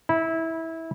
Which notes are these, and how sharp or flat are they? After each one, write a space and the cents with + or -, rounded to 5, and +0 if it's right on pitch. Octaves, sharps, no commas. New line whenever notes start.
E4 -20